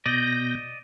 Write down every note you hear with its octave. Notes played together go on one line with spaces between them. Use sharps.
B2 D5 D#5 G6 A#6